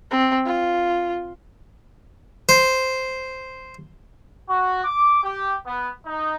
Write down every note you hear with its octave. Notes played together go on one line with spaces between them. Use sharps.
C4
F4
C5
F#4
D6
G4
B3
D#4